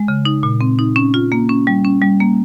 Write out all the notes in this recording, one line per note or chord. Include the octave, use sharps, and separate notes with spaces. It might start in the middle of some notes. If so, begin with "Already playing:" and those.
Already playing: G#3
C#3
D#4
A#2
C4
D#4
C#4
F4
A#3
C#4
G3
C#4
G3
A#3